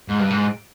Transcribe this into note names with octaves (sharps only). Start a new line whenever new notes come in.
G#2
G2
G#2